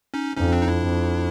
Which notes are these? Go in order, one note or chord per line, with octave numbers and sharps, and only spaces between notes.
C#4 D#4
F2 C#4 D#4
C4 D4
D#4
D4 E4
F2